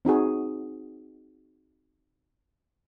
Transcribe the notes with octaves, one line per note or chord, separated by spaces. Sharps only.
C4 D#4 F#4 G#4